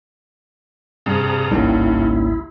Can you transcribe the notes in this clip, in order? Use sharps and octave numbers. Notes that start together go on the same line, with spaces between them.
G2 C3 G#4 A#5
G#1 C#2 G3 A#3 C#4 D#4 E4